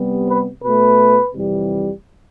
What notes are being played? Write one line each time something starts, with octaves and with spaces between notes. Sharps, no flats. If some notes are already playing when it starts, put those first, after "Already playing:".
Already playing: C3 G3 B3
B4
B2 A3 B4
F2 C3 E3 G3